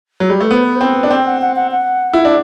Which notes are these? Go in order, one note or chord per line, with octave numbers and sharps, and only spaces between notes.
F#3
G3
A3 B4
B3 C5
B4
C4 C5
B4
D4
C4 G5
F#5
F#5
F#5
F#5
E4
D4